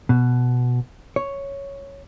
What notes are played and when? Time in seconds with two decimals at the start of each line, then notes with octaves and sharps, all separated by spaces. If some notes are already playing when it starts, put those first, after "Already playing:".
0.09 B2
1.16 C#5